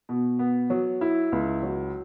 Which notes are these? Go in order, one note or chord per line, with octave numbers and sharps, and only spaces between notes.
B2
B3
F#3
E4
C#2
F#3